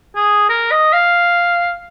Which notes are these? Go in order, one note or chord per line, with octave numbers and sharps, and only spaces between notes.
G#4
A#4
D#5
F5